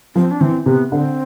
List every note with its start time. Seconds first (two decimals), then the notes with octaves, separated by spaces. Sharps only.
0.16 F3 C4
0.31 D4
0.41 E3 C4
0.66 C3 B3
0.91 D3 C4